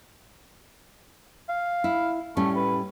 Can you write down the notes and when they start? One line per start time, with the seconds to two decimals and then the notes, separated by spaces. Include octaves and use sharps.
1.49 F5
1.84 E4
2.37 A2 G3 A3 C#4
2.56 B4